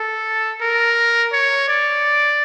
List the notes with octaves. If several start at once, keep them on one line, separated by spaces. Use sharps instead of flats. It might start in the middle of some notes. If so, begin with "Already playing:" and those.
Already playing: A4
A#4
C#5
D5